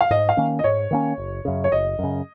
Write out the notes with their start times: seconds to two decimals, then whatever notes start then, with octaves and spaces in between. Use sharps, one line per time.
0.01 F5
0.10 G#2 D#5
0.29 F5
0.37 D#3 A#3 C#4
0.59 D#5
0.64 G#2 C#5
0.91 D#3 A#3 C#4
1.18 F#1
1.45 F#2 C#3
1.64 C#5
1.72 F#1 D#5
1.99 F#2 C#3